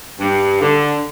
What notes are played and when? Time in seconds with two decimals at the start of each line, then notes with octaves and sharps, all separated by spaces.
0.19 G2
0.61 D3